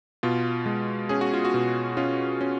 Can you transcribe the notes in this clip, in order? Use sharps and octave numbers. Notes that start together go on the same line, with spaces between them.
B2 F4
G#3
C#4 G#4
F#4
F4
F#4
B2
C#4 F4
C#4